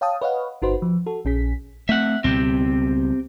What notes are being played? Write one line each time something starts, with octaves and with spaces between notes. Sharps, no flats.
C#5 F5 G5 A5 D#6
B4 C#5 D#5 F5 F#5
G1 D#4 F#4 B4 C5
F3
F#4 A4
A#1 C#4 G#4 B6
A3 C4 E5 F#5
C#2 B2 G3 C4 G4